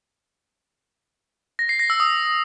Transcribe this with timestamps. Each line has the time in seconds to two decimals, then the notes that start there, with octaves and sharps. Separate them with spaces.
1.59 A#6
1.69 C7
1.79 A#6
1.90 E6
2.00 D#6